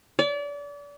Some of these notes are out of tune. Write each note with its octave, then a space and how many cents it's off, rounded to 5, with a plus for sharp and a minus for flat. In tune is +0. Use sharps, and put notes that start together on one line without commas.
D5 -35